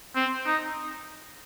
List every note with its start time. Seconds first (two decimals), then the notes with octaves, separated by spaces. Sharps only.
0.15 C4
0.46 D#4